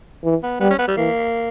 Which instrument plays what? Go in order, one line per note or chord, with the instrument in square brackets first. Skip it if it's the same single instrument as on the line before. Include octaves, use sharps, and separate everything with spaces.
[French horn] E3
[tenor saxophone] B3
[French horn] G3 [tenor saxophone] B3
[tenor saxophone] C#4
B3
G3
[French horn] E3 [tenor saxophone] A#3